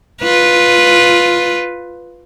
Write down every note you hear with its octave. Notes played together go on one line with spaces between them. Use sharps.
F4 B4